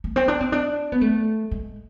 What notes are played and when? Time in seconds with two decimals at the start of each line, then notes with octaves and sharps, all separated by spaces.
0.04 A3
0.16 C4
0.28 D4
0.41 C4
0.52 D4
0.92 B3
1.01 A3
1.51 G#3